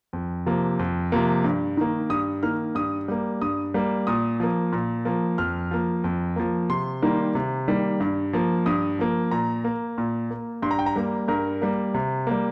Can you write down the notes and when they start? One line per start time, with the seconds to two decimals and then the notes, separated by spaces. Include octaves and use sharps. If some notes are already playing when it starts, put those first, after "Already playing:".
0.13 F2
0.46 C3 F3 A#3
0.79 F2
1.12 C3 F3 A#3
1.44 G2
1.77 D#3 A#3
2.10 G2 D#6
2.43 D#3 A#3 F6
2.75 G2 D#6
3.08 G3 A#3
3.41 G2 D#6
3.74 G3 A#3
4.07 A#2 D#6
4.40 F3 A#3
4.72 A#2
5.05 F3 A#3
5.38 F2 F6
5.71 F3 A#3
6.04 F2
6.36 F3 A#3
6.69 C3 C6
7.02 D#3 G3 A#3
7.35 C3
7.68 D#3 G3 A#3
8.00 G2
8.33 F3 A#3
8.66 G2 D#6
8.99 F3 A#3
9.31 A#2 A#5
9.64 A#3
9.98 A#2
10.30 A#3
10.62 G2 C6
10.71 A#5
10.79 G5
10.86 A#5
10.96 G3 A#3
11.28 G2 A#4
11.61 G3 A#3
11.94 C3
12.27 G3 A#3